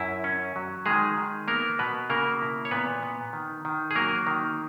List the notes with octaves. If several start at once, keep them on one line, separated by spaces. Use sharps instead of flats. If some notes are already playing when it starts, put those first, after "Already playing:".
Already playing: F#2 E4
C#4
F#3
D#3 G#3 G#4
D#3
A#3 B3 A#4
B2 B3 B4
C#3 A#3 A#4
E4
C#5
A#2 B3 B4
B3
D#3
D#3
G#4
F#3 A#3 A#4
D#3